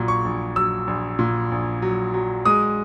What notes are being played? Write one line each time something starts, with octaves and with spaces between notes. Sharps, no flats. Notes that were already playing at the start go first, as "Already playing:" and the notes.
Already playing: A#1 A#2 F#3
C#6
A#1
F#3 E6
A#1
A#2
A#1
F#3
F#3
G#3 D#6